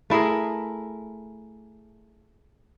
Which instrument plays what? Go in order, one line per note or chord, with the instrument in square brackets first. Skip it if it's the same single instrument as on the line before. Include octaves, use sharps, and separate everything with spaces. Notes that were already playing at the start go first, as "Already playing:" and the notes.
[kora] A3 E4 G#4 A#4